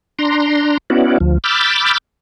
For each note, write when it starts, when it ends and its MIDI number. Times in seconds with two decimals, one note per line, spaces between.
0.19 0.78 62
0.19 0.78 82
0.19 0.78 84
0.90 1.18 59
0.90 1.18 61
0.90 1.18 64
0.90 1.18 66
0.90 1.18 74
1.20 1.38 38
1.20 1.38 53
1.44 1.98 83
1.44 1.98 86
1.44 1.98 88
1.44 1.98 89
1.44 1.98 91
1.44 1.98 93